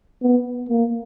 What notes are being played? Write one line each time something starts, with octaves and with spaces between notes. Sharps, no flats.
B3
A#3